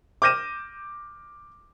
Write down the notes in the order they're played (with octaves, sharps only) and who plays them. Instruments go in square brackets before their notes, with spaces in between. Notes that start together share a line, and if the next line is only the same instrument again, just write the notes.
[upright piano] D6 F6 G6 A#6 D#7 E7